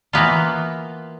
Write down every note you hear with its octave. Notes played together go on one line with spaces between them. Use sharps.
E3 A#3 B3 F4